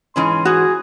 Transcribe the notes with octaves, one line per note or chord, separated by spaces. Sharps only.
G#2 E3 C#4 C6
F#4 G#4